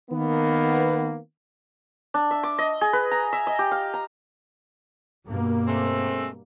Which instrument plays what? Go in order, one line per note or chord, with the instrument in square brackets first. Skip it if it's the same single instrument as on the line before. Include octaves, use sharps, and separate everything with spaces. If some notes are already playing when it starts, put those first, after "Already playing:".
[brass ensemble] D#3 A#3 B3
[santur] D4
E5
D6
D#5
G#4
B4
A#5
E5
D#5
G4
F5
A#5
[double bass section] G2 B2 A#3
[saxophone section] G#3 A3 C4